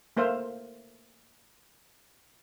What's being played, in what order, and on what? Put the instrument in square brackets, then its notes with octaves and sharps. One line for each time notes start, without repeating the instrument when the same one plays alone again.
[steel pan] A3 A#3 C5 E5 F5